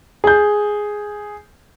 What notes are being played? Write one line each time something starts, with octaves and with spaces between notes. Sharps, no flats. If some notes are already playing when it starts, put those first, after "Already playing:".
G#4 G6